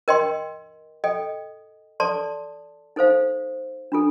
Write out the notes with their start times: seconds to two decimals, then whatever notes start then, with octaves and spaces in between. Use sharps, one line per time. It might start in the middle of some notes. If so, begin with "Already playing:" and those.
0.08 A#4 D#5 G5 C6
1.04 A4 D#5 G5
2.00 A4 D5 A5 C6
2.96 D#4 A4 C5 F5
3.92 D4 F4 A4